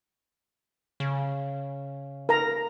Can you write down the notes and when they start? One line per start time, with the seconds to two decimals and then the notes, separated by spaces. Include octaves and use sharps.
1.00 C#3
2.29 A#4 A#5